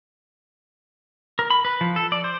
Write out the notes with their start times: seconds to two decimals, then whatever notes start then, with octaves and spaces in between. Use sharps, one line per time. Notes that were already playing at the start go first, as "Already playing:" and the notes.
1.39 A#4
1.50 B5
1.65 B4
1.81 F3
1.96 A4
2.12 D5
2.24 C5